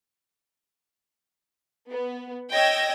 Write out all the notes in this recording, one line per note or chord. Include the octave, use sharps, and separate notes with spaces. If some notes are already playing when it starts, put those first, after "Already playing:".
B3
C#5 D#5 G5 E6 G#6 A#6